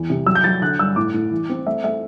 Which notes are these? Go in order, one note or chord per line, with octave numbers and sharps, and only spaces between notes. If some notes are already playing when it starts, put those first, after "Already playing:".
Already playing: E2 E3
C3
F#3 E6
G6
F#3 A6
D3 F#6
G2 E6
A2 D6
A2
E3
C4
A3 E5
A3 E5